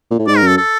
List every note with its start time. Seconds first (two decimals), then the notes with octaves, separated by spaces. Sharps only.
0.11 A#2
0.19 A2
0.27 G#2 D5
0.38 A#4
0.43 F#2 A4
0.57 A4